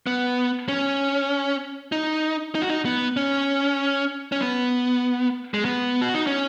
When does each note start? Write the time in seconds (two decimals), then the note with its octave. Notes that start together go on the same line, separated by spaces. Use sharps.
0.07 B3
0.68 C#4
1.92 D#4
2.55 D#4
2.62 F#4
2.69 D#4
2.85 B3
3.17 C#4
4.32 C#4
4.41 B3
5.54 G#3
5.65 B3
6.02 F#4
6.14 D#4
6.27 C#4